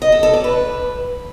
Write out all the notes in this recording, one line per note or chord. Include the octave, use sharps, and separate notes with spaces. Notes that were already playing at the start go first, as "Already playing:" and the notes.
D#5
A4
A4
D5
B4